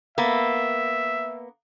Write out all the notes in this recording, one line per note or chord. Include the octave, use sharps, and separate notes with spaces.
A#3 B3 E5